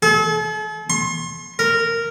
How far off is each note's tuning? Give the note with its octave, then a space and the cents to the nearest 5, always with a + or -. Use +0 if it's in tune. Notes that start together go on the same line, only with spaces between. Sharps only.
A4 -45
C6 +40
A#4 -10